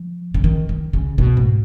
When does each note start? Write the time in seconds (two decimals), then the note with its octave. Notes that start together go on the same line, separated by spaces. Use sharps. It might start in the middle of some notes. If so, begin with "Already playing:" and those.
Already playing: F3
0.34 C#3
0.44 D#3
0.69 D#3
0.93 C#3
1.18 B2
1.37 G#2